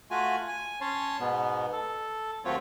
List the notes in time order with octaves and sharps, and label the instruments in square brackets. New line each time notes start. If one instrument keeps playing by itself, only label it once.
[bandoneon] A3 F4 F#4 G#5
G#5
C#4 C#5 A5 C6
G#2 B2 B3
A4
D#2 F#3 A3 C4 F4 C#5